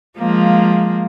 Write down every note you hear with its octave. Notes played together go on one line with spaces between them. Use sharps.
F3 G#3 A#3